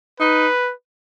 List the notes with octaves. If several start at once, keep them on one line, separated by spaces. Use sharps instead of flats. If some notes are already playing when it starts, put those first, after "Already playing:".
D#4 B4